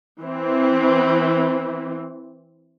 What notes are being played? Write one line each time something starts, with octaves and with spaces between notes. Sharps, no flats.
E3 C4